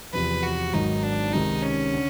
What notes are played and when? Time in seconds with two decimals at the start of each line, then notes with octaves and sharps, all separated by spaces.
0.13 E2 C3 F3 B4
0.43 F#4
0.73 G#1 G#2 D#3 F#3 D#4
1.03 D4
1.33 C#2 C3 D#3 D#4
1.62 C#4
1.92 D3